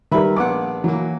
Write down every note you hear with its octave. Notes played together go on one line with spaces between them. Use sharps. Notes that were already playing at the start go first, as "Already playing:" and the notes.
D#3 G3 A#4 B4 E5 B5
A#1 B3 F#5 D6
E3 F#3 A#3